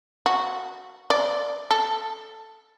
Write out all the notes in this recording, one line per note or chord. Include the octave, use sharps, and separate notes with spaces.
F#4
D5
A4